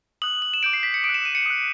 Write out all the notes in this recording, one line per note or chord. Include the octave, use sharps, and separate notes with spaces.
D#6 F#6 F#7
F#7
E7
D6 G6 D7
C7
B6
C#7
D#6 D7
F#6
E7
D#7
C#7
D#6 F#6